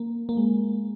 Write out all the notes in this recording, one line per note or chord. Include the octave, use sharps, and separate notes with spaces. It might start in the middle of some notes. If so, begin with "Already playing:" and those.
Already playing: A#3
A#3
G#3